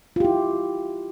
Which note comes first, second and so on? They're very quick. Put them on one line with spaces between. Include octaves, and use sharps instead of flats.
F4 G4 E4